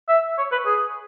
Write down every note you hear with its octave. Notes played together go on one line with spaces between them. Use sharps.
E5
C#5
B4
G#4